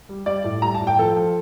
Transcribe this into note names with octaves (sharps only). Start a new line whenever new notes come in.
G3
G3 D5
A2
G3 A#5
A5
A2
G5
F3 A4
F3